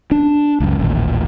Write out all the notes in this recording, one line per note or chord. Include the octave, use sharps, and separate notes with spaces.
D4
C#2 F#2
D#1 A1 D#2